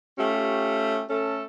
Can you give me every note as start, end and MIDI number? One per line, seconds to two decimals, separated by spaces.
0.18 1.04 57
0.18 1.04 61
0.18 1.04 65
0.18 1.04 67
1.10 1.45 57
1.10 1.45 61
1.10 1.45 69